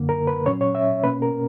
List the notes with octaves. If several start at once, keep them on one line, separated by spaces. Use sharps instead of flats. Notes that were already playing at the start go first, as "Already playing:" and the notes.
Already playing: F#2 D3 A#3
A#4
B4
A#2 F#3 C#4 C#5
C#5
E5
B2 A#3 C#4 B4
A#4